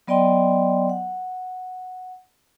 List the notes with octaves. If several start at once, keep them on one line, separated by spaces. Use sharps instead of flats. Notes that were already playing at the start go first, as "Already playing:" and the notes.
F#3 B3 D5 D#5 G5 C6
F#5